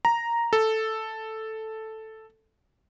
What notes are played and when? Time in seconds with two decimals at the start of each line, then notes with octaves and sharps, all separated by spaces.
0.05 A#5
0.53 A4